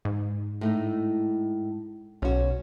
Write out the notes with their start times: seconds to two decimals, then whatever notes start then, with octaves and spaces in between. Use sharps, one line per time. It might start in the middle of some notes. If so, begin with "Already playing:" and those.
0.05 G#2
0.61 A2 A3 D#4
2.22 B1 C#4 F#4